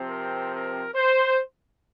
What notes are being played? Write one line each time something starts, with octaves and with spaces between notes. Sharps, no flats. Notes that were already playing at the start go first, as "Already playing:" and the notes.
Already playing: C3 F3 C4
A#4
A#4
C5